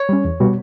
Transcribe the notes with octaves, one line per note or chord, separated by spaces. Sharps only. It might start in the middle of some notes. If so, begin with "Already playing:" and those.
Already playing: C#5
G3 C#4
E2
B2 G3 B3 F#4